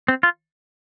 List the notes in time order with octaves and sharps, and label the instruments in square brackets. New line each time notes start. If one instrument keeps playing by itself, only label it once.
[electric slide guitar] C4
F4